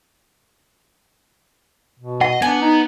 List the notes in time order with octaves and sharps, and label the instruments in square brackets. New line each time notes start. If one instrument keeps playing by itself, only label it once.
[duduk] B2
[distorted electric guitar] D#5 [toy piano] F#5
[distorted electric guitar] B3 [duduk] D4 [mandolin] G#5
[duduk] D#4